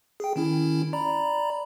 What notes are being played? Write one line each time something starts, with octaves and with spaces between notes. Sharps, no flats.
G#4 G5
D#3 C#4 E4
D5 A#5 B5